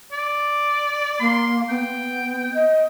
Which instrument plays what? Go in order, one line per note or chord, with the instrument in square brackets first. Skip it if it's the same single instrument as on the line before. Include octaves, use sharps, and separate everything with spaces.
[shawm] D5
[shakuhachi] A#3 [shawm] C6
[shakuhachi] B3 [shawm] G5
[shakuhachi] D#5